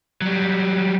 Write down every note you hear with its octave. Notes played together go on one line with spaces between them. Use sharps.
F#3 G3